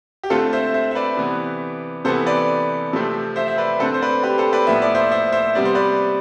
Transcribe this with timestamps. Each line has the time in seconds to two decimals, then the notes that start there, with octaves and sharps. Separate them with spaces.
0.23 G4
0.30 D3 A3 C4 F4 A4
0.53 C5 E5
0.74 C5 E5
0.91 E5
0.95 B4 D5
1.17 C3 E3 B3
2.05 C3 E3 B3 A4 C5
2.26 B4 D5
2.93 C3 F3 A3 C4
3.36 C5 E5
3.48 E5
3.58 B4 D5
3.80 D3 A3 C4 A4 C5
3.94 C5
4.01 B4 D5
4.23 G4 B4
4.38 A4 C5
4.53 B4 D5
4.67 A2 F3 B3 E5
4.82 D5
4.95 C5 E5
5.11 C5 E5
5.32 C5 E5
5.55 C3 G3 B3 D5
5.65 C5
5.75 B4 D5